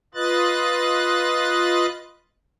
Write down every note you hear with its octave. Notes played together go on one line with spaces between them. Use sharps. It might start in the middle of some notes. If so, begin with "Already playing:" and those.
F4 B4 D#5 F#6 A6